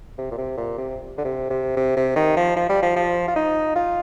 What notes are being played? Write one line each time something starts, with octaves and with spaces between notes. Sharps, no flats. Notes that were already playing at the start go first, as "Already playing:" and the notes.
C3
A#2
C3
A#2
C3
D3
C3
C3
C3
C3
D#3
F3
F3
G3
F3
F3
F4
D#4
F4